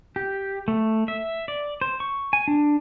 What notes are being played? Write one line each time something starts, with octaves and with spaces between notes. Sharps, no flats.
G4
A3
E5
D5
C5
C#6
G#5
D4